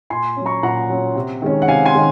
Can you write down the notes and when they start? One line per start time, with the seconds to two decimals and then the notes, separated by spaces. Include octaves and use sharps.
0.10 A#2 G#5 C6
0.36 C#4
0.42 F#3 A#5 C#6
0.63 A#2 F#5 A#5
0.90 F#3 C#4
1.15 C3
1.42 D#3 G#3 C#4
1.62 F#5
1.68 C3 F5 G#5
1.86 G#5 C6
1.94 D#3 G#3 C#4